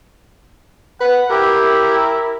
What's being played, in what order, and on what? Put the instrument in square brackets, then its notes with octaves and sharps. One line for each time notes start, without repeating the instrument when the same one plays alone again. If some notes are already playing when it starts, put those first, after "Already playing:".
[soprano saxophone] B4 [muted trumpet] F#5
[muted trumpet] E4 [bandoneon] G4 [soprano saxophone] A#4